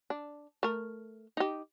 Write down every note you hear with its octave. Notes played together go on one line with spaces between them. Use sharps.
D4
A3 A#4
D#4 G4